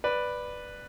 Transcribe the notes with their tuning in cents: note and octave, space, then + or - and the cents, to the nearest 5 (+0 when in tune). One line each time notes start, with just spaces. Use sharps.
B4 +0 D5 +10